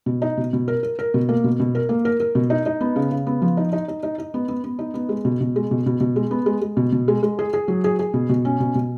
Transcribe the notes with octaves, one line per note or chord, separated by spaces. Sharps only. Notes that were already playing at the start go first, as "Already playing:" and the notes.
B2
D#4
B2
B2
A#4
A#4
A#4
B2
A#3
B2
B2
A#4
A#3
A#4
A#4
B2
D#4
D#4
B3
C#3
C#3
B3
F3
D#4
D#4
D#4
D#4
D#4
B3
B3
B3
D#4
B3
G#3
B2
B2
G#3
B2
B2
B2
G#3
B3
G#3
G#3
B2
B2
G#3
G#3
G#4
G#4
F#3
G#4
G#4
B2
B2
C#4
B2
B2